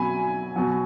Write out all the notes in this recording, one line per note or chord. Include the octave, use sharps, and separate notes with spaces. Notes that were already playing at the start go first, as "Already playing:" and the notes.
Already playing: B2 F#3 G#5 B5
B2 F#3